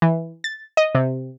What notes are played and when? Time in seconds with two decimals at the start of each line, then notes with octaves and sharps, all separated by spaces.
0.02 E3
0.44 A6
0.77 D#5
0.95 C3